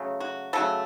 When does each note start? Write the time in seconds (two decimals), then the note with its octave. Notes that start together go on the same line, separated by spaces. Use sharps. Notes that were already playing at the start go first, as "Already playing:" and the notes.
Already playing: C#3 F#3 A3
0.20 F#4
0.53 C#3 F#3 A3 A4